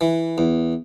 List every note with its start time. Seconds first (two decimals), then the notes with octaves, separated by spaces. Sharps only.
0.01 E3
0.38 E2